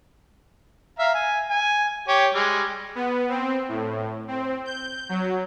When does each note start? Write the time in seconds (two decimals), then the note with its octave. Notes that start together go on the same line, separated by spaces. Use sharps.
0.99 E5 F5 A#5
1.14 G#5
1.50 G#5
2.08 G4 C#5
2.34 G3 G#3
2.95 B3
3.29 C4
3.68 A2
4.28 C4
4.65 G6
5.09 F#3